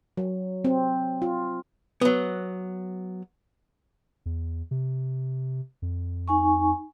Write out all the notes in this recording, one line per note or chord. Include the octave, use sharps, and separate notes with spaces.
F#3
C4
F4
F#3 B3
E2
C3
F2
D#4 G#5 C#6